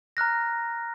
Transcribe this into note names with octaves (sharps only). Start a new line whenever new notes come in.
A#5 F6 F#6 A#6